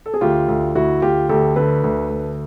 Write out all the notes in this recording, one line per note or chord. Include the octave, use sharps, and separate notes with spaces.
A4
G#4
D2 F4 G4
D2
D2 E4 F#4
D2 F4 G4
D2 G4 A4
D3 A4 B4
D2
D2